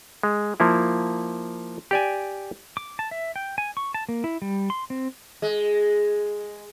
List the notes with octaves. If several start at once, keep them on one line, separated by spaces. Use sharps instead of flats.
G#3
F3 A#3 E4
G4 D5 G#5
D6
A5
E5
G5
G#5
C#6
A5
A#3
E4
G3
C6
C4
G#3